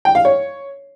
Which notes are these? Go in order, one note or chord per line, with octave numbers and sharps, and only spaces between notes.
G5
F5
C#5